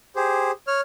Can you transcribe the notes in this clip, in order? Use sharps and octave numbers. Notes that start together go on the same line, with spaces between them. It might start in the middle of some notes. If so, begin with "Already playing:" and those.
G4 G#4 C5
C#5 F6